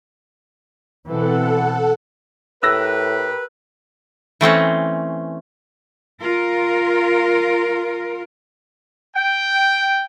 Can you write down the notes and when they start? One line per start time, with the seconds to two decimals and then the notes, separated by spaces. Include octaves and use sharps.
1.06 B2 E3 C4 A4 F#5
2.63 A2 G4 A#4 B4 E6 F#6 A#6
4.41 E3 A3 C4 C#4
6.20 F4 A#4
9.16 G5